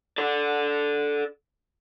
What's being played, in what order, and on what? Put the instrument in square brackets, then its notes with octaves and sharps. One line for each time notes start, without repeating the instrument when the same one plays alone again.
[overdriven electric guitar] A4 D5